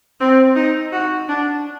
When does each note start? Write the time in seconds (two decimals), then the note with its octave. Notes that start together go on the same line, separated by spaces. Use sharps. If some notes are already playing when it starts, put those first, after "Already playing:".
0.20 C4
0.55 D#4
0.93 F#4
1.29 D4